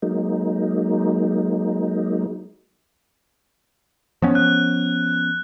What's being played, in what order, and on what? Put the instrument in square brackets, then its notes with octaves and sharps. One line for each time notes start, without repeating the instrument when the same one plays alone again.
[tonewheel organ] F#3 G#3 A#3 D#4
[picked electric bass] F3 B3 C#4
[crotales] F#6